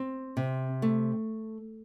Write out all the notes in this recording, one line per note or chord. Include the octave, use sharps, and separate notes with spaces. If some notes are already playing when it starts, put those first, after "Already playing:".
Already playing: C4
C3
A3